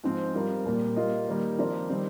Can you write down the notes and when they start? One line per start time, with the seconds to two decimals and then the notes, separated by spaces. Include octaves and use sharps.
0.04 G#2 F3 C4
0.35 G3 C4 F4 A#4
0.65 A#2 G3 A#3
0.96 G3 A#3 F4 A#4 D#5
1.27 D#3 G3 A#3 D#4
1.59 F3 C4 F4 A#4 D5
1.89 D#3 G3 C4